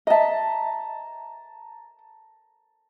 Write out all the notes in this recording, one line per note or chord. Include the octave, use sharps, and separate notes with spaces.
D#5 E5 A5 A#5